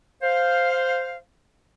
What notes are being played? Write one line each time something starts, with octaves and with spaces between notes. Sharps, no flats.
C5 F5